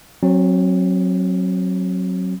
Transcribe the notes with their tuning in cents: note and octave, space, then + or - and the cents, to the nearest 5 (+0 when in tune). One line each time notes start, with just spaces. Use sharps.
F#3 +0 C4 +35